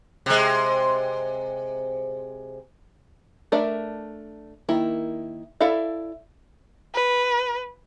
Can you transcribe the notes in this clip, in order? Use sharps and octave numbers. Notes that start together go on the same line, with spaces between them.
C3 G#3
A3 D4 A#4 D5 E5
D#3 A#3 E4
E4 A4 D5 E5 F5
B4